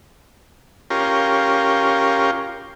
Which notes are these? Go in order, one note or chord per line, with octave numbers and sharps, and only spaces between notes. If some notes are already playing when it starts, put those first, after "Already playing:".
C#4 F4 G4 A#4